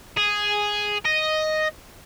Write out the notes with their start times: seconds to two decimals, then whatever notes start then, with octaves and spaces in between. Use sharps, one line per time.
0.17 G#4
1.05 D#5